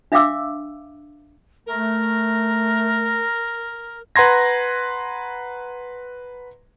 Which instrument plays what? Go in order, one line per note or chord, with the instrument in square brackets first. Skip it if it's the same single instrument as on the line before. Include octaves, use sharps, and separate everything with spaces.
[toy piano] D4 E5 F5 G5 D6 E6
[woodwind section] A3 [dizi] A#4
[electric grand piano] B4 F#5 A#5 C6 G#6 A#6